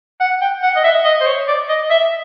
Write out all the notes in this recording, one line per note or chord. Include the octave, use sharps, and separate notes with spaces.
F#5
G5
F#5
D#5
E5
D#5
C5
C#5
D5
D#5
E5